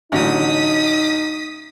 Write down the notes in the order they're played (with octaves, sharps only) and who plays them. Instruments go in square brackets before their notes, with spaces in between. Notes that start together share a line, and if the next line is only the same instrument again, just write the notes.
[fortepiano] A1 D3 F#3 [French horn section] D#4 [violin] D#6 B6